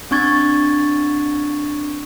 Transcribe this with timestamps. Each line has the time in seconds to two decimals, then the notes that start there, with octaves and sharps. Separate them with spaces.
0.11 C4 D4 C#6 G#6 A6